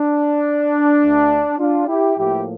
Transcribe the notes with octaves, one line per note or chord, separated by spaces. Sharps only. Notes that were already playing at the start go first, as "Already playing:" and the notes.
Already playing: D4
D2 D3 A3
D4 F4
E4 G4
A2 F3 A#3 E4 G4